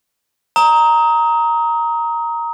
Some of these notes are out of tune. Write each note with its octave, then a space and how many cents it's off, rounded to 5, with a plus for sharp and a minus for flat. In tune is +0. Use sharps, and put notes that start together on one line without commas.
A#5 +0 D#6 +30